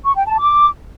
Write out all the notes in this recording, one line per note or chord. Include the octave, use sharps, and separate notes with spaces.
C#6
G5
A5
D6